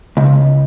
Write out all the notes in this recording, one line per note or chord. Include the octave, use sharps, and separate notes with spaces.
C#2